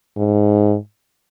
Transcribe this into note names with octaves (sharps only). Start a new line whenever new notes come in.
G#2